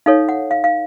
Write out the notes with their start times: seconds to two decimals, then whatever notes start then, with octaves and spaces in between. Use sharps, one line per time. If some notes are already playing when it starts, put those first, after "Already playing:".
0.06 D#4 A4 C#5 F5
0.29 F#5
0.51 F5
0.64 F5